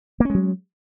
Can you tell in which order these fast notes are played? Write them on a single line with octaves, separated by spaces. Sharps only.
A#3 C#4 G#3 F#3